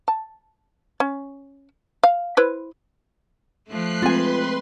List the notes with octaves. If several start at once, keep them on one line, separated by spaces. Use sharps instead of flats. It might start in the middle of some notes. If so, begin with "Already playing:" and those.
A5
C#4
F5
E4 B4 C5
F3 A3 F#6 C7
G#3 C4 F4 B4 G#5 C6